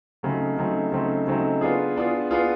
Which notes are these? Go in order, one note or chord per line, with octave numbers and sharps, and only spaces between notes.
C#3 F#3 A3 C4 D#4
C#3 F#3 A3 C4 D#4
C#3 F#3 A3 C4 D#4
C#3 F#3 A3 C4 D#4
B3 D4 F4 G#4
B3 D4 F4 G#4
B3 D4 F4 G#4